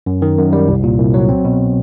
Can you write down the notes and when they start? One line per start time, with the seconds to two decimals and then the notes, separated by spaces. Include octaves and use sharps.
0.06 F#2
0.22 D#3
0.37 F#2
0.53 G3
0.68 C2
0.83 A#2
0.99 C2
1.14 F#3
1.29 C4
1.45 B2